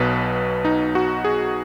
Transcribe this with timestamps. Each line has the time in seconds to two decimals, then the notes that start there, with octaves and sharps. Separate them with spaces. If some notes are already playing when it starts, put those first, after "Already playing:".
Already playing: B1 B2 F#3 B4
0.65 D#4
0.95 F#4
1.25 G#4